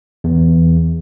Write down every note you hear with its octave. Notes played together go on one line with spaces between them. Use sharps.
E2